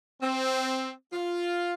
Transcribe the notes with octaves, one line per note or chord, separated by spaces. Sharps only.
C4
F4